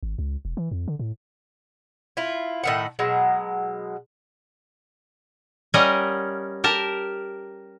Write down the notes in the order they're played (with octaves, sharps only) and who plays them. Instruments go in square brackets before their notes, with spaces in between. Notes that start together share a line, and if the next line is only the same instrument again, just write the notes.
[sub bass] G#1
C#2
E1
E3
F2
D3
A2
[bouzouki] E4 F4
A2 D#3 F#5
B2 F#3 G#3
[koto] G3 C#4 A#4 D#5 F#5
G4 A#4 A5